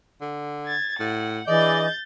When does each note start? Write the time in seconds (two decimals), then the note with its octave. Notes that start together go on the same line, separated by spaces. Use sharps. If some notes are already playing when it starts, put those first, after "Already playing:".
0.21 D3
0.66 G#6 A6
1.00 A2 F#5
1.48 E3 D4 G#4 D5 D#5 G6 A6